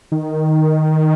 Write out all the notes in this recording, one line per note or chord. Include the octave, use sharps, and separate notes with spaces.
D#3